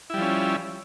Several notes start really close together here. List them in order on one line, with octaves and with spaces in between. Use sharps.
E4 G3 F3 C#4